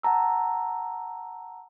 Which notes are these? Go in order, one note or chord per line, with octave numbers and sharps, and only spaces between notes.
F#5 A5 A#5 E6